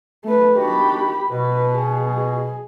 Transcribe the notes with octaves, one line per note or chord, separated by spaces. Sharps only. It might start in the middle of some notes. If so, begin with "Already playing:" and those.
A3 B4
D#3 D4 F#4 G4 B5
B2 B4
G#4